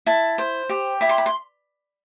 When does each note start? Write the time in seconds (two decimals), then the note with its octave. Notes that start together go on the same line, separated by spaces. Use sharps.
0.06 E4 A5
0.38 C5
0.69 G4
1.01 E4 B5
1.09 C6
1.18 B5
1.26 C6